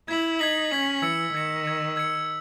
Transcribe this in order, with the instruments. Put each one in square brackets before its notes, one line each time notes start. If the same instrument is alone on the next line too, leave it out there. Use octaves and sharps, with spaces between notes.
[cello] E4 [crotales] G#6 B6 F#7
[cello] D#4 [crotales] G#6 B6 F#7
[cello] C#4 [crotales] G#6 B6 F#7
[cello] E3 [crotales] E6 G#6 C#7
[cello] D#3 [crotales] E6 G#6 C#7
[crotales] E6 G#6 C#7
E6 G#6 C#7